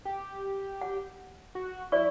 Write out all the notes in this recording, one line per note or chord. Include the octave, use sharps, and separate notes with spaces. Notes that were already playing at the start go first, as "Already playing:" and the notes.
G4
F#5
F#4
E4 C5 D5 C#6